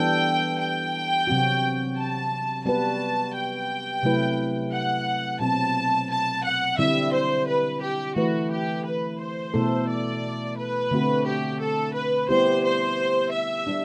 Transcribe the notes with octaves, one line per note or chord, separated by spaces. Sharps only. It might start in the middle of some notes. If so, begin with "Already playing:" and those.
Already playing: E3 G3 B3 D4 A4 G5
G5
C3 F#3 C4 F#4
A5
G3 B3 F#4 B4 A5
G5
C3 F#3 A3 E4 B4
F#5
B2 F#3 C4 A5
A5
F#5
D3 G3 C4 E4 E5
C5
B4
G4
E3 A3 E4 F#4 B4
G4
B4
C5
B2 A3 E4 A4
D5
B4
D3 A3 C4 F#4
G4
A4
B4
G3 B3 E4 G4 C5
C5
E5
G3 D4